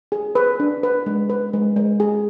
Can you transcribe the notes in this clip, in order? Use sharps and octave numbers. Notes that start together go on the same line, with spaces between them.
G#4
B4
D4
B4
G#3
B4
G#3
G#3
G#4